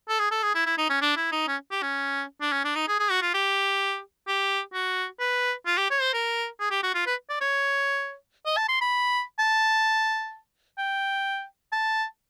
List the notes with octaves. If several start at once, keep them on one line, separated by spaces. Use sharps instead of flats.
A4
G#4
A4
G#4
E4
E4
D#4
C#4
D4
E4
D#4
C#4
G4
C#4
D4
C#4
D4
D#4
G#4
G#4
F#4
F4
G4
G4
F#4
B4
F4
G4
C#5
C5
A#4
G#4
G4
F#4
F4
B4
D5
C#5
D#5
A5
C6
B5
A5
G5
A5